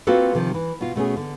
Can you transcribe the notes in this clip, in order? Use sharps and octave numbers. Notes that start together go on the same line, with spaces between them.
A#3 C4 F4 F#4 A4 B4
C3 D#3 F3
E3
B2 F4
B2 A3 C#4 G#4
D3